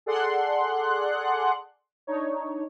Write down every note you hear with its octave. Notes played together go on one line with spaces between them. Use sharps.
G#4 A4 D5 F#5 C6 F#6
D4 D#4 C#5